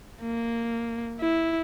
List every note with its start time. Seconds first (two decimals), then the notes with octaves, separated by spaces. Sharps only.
0.22 A#3
1.21 E4